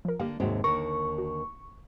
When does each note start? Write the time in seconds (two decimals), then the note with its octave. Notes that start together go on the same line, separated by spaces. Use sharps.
0.05 F3 A#4
0.20 D3 A#3 G4 F5
0.40 D#2 G#2 C3 C4 F#4
0.64 D#2 D3 A#4 C#6
1.18 F#4